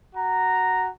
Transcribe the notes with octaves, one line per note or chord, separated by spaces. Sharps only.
F#4 A#5